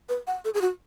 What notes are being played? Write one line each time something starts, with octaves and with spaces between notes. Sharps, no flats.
B4
F#5
A4
G#4
F#4